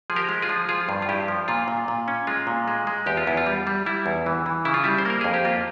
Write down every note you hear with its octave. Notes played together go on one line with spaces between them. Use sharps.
F3 G#4
G4 A#4
G#3
F4 G#4
F3
F3 F4 G#4
G2
F4
G2 E4 G4
F3
A#2 F4
A#2
A#2
C#4
G#3 F4
A#2
G#3
G#3
E2 G4
F4
E2 E4
F4
G3
G3
G3 E4
E2
E3
E3
C#3 E4
F4
G3 E4
C5
A#3 A#4
F2 G#4
G4
A#3 F4